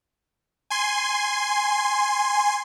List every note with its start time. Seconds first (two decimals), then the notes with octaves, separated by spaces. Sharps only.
0.70 G#5 C6